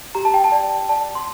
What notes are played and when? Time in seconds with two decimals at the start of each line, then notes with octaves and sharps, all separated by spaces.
0.15 G4 A#5
0.25 A5
0.34 G5
0.44 A5
0.52 D5
0.89 D5 A5
1.15 C6